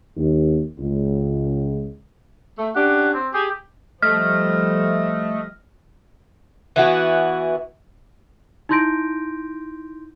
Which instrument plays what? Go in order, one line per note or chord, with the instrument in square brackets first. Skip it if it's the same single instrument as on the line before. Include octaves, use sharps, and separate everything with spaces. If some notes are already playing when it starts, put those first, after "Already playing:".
[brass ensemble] D#2
C#2
[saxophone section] A3
[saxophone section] C#4 D4 G4 [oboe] F#5
[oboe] C4
[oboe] G4 [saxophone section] G#4
[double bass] F3 G3 [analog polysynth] A3 [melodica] D#5 [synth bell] F6
[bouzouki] E3 B3 F#4
[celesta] D#4 E4 C6 G6 A#6 D7